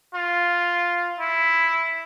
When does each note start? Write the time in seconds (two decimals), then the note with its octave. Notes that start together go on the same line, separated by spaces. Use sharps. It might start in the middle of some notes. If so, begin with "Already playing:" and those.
0.15 F4
1.20 E4